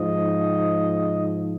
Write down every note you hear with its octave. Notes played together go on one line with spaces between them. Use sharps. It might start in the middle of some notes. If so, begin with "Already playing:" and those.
Already playing: G#2 F3 D#5